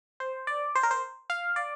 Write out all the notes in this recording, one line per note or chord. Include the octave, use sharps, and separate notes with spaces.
C5
D5
C5
A#4
C5
F5
D5